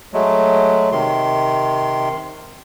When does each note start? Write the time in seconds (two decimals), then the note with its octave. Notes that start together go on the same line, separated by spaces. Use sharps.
0.14 F#3 G#3 A3
0.92 C3 D#3 C6